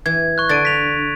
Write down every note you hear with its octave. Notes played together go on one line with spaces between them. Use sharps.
E3 G#6
C#6 F#6
D3 D4 A6 D7 D#7
B6 F7